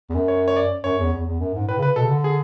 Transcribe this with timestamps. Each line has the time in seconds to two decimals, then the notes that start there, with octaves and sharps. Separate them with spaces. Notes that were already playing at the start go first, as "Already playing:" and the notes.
0.10 E2
0.14 F#2
0.28 C#5
0.48 C#5
0.56 D5
0.84 F#2 C#5
0.98 E2
1.13 E2
1.26 E2
1.40 F#2
1.54 G#2
1.68 A2 B4
1.78 C#3
1.83 B4
1.96 B2 A4
2.04 C#3
2.10 D3
2.24 G#4